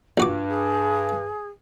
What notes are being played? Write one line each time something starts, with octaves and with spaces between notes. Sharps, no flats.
A#1 G2 F4 F#4 D6
G#4